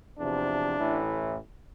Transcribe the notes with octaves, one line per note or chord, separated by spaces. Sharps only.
E2 C3 F3 D4
A1 A2 E3